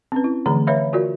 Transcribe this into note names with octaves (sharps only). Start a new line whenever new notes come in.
C4 C#4 B4
E4
D3 E3 F3 A3 G#4 A#5
B4 C#5 E5 F5 B5
F4 F#4 A#4 D5